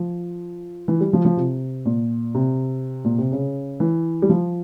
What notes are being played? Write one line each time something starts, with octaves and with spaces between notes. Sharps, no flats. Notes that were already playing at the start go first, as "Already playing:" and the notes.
Already playing: F3
E3
G3
F3
F3
C3
A#2
C3
A#2
C3
C#3
E3
G3
F3